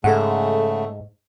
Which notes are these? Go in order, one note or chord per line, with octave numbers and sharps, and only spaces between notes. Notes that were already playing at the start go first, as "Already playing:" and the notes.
G#2 C#3 A3 A4 F#5